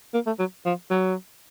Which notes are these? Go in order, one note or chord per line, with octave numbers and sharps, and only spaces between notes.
A#3
A3
F#3
F3
F#3